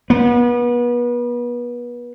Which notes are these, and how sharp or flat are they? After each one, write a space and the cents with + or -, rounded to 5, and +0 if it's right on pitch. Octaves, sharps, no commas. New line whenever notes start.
B3 -30